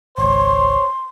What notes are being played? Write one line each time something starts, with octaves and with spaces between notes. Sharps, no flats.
G#1 C#2 C5 C#5 C6